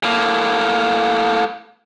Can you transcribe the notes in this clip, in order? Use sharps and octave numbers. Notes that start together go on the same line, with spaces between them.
A2 A#3